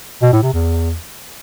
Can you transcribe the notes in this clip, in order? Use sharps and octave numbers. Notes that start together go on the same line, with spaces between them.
B2
A2
C3
E2